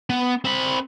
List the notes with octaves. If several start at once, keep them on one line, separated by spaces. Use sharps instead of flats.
B3
C4 B5